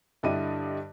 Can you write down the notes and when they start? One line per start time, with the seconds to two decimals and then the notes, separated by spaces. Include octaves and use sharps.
0.23 G2 D3 G3 E4 D#5 D#7